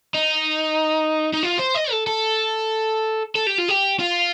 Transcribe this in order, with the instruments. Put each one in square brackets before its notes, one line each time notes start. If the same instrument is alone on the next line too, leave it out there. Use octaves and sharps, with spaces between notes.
[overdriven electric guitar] D#4
D#4
F4
C5
D#5
A4
A4
A4
G4
F4
G4
F4